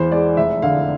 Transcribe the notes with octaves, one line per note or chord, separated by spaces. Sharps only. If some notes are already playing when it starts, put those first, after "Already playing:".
Already playing: E2 E3 C5
G#3 D5
F1 E5
D3 F5